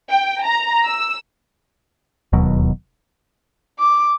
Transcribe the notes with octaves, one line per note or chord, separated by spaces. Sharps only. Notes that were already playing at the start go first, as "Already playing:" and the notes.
G5
A#5
E6
D1 D#2 B2 F#3
D6